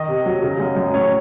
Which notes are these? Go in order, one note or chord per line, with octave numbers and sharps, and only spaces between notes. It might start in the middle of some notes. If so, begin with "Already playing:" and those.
Already playing: D#3 D#5
C3
F#3
C#3
F#2
F#2
A2 C#5